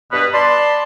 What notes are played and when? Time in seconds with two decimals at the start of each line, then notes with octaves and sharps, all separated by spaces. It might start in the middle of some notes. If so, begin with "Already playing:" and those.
0.12 G2 B2 B3 B4
0.33 D5 A5 B5 C6